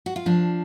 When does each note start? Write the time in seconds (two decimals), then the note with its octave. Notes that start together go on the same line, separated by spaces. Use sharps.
0.06 F#4
0.16 F4
0.26 F3 D4